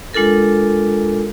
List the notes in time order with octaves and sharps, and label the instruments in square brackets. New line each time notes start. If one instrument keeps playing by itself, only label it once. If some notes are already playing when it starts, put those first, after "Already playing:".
[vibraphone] G#3 D4 F4 A4 A#4